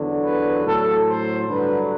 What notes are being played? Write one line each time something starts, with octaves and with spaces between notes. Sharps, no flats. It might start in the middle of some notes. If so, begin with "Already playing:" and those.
Already playing: E2 D3 F#3
B4
A2 F#3 A4
C5
G2 D3 F#3 B4